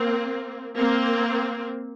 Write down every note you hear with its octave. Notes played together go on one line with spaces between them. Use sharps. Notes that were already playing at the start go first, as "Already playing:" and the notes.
Already playing: A#3 C4
A#3 C4